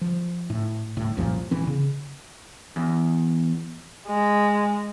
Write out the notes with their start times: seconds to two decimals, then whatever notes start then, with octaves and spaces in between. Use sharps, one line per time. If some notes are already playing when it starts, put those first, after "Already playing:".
0.01 F3
0.50 A2
0.97 D#1 A2
1.17 C2 F#2 A#2 F3
1.51 E1 A#1 E3 C4
1.67 C#3
2.76 E2
4.08 G#3